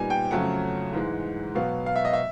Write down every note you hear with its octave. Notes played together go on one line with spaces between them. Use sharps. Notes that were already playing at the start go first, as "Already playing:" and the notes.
Already playing: A#2 G3 B3 D#4 G#5
G5
F2 C#3 F#3 A3 C#4 F#5
G#2 E3 G#3
B2 F#3 B3 F5
F5
E5
D#5
E5